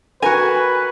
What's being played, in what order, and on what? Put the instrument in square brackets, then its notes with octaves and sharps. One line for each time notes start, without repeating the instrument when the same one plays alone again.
[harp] F#4 A#4 [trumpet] B4 [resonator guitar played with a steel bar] G#5